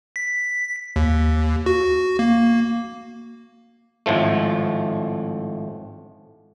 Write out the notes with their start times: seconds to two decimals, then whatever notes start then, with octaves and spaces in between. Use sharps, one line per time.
0.16 B6
0.96 D#2
1.66 F#4
2.19 A#3
4.06 G#1 A2 F3 A3